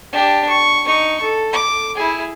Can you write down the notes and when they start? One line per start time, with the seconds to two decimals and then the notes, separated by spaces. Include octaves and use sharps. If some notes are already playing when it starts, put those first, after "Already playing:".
0.13 D4 G4
0.49 C#6
0.86 D#4 C#6
1.22 A4
1.53 D6
1.95 E4 G#4